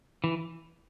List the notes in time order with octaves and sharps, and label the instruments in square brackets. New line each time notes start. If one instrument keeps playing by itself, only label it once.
[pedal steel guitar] E3